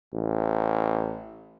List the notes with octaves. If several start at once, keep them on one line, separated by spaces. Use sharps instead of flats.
A1